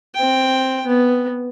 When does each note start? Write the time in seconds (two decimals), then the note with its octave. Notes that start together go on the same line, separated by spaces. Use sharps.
0.15 C4 G5
0.87 B3